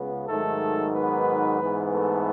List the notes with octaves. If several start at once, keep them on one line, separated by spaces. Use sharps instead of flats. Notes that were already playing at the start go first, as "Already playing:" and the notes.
Already playing: C#2 C#3 B3
G#2 D#3 F#3 A3 A4
B3 B4
G#2 E3 B3
A3 A4